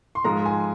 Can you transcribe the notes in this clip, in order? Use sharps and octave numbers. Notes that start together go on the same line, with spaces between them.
C6
G#2 F3 G#3 A#5
G#5